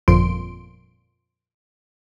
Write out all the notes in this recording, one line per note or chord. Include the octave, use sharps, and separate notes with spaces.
G1 F2 A#2 F3 C6 D7